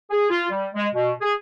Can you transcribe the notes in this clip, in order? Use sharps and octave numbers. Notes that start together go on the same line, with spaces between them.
G#4
F4
G3
G#3
B2
G#4